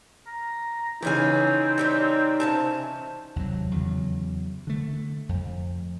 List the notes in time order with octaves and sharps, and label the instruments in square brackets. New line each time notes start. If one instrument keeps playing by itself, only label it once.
[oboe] A#5
[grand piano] C#3 E3 [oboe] C4 [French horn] D#4 [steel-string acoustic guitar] G#4 C#5 G#5
[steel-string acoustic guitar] G3 G4 C#5
C3 C#4 A5
[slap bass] D#2 C3 F#3
E2 C#3 F#3
D3 A3
F2